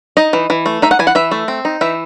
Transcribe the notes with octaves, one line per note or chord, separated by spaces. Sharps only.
D#4 D#5
E3
E3
A3
D#4 E5
F#5
E3 G#5
F#5
E3 E5
A3
C4
D#4
E3 E5